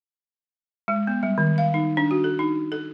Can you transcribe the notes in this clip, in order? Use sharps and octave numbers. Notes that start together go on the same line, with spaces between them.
G#3
B3
G3
D#3
F5
D#4
D4
F#4
A4
D#4
A4